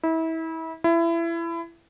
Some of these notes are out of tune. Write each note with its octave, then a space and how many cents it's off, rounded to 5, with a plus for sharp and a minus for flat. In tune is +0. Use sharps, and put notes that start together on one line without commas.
E4 -30
E4 +25